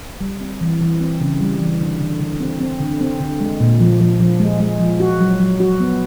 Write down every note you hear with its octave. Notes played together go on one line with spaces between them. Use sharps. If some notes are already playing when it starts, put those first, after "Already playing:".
G3
C4
E3
E3
C4
C#3
G3
E3
D3
D3
D3
C4
C4
D3
C4
D3
G#3
A#2
F3
F3
F3
G#3
G#3
F3
F#4
F#3
F#3
F#4
B3